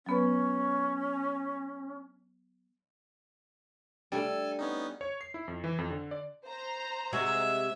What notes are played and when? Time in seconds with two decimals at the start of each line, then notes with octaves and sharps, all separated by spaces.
0.06 F#3 B3 C#4 B4
4.12 G3 A3 D4 A4 G#5
4.59 B3 C#4 D#4
5.01 C#5
5.21 C7
5.34 E4
5.48 F2
5.64 E3
5.78 F2
5.90 D3
6.11 D5
6.46 C5 A#5
7.13 C3 G#3 F#4 E5